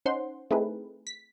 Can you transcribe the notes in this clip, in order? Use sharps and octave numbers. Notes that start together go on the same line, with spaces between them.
C#4 D#4 C5 F#5 C6
A3 C4 D#4 E4 G#4 B4
B6